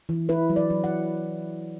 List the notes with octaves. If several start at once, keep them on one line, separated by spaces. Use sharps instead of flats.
E3
E4 B4
F#3
D5
F#3
F#5